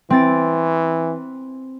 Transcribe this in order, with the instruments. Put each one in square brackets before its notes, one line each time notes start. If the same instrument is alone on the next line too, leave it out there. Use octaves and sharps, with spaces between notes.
[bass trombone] E3 [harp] C4 A6 D7